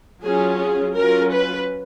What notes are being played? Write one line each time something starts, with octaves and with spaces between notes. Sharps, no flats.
F#3 C#4 F4 G#4
G#4
F#3 C#4 F4 A#4
B4